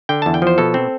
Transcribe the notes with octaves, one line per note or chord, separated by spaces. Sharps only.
D3 G5
E2 A5
G5
F3 C5
B2 A4
C4